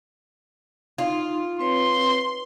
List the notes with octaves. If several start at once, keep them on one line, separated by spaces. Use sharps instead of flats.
D#4 F4
C4 B4 C#5 C6